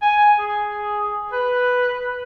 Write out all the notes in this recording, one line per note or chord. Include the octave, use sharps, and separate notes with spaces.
G#5
G#4
B4